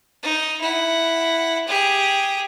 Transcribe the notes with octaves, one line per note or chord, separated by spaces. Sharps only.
D#4
E4 F#5
G4 G#4